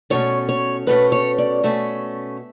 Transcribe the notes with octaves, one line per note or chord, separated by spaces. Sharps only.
B2 A3 C#4 C#5
C#5
B2 A3 C#4 B4
C#5
D5
B2 A3 C#4 E5